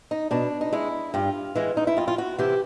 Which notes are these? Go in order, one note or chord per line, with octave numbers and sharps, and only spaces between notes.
D#4
B2 D4
D#4
G#3 E4
G2 F4
E3 G#3
D#4
E4
F2 F4
F4
F#4
C3 E3 G4